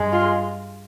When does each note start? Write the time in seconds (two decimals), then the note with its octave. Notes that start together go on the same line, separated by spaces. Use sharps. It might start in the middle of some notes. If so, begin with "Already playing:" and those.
Already playing: G2 G#3
0.12 F4